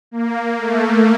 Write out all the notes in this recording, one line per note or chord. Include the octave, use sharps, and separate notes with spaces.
A#3
A3